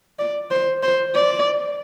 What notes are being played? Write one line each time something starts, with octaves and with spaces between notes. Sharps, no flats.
D5
C5
C5
D5